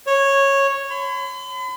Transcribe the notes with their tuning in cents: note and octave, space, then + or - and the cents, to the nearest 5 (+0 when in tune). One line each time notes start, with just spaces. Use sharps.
C#5 -10
B5 +45